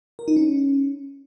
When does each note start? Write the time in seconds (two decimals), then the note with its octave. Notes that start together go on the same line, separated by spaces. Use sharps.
0.19 A#4
0.28 D#4
0.36 C#4